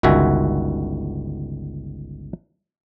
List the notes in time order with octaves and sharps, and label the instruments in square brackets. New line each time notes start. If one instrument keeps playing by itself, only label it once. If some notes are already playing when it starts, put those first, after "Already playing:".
[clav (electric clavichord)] G1 C#2 D#3 F#4 E5 G#5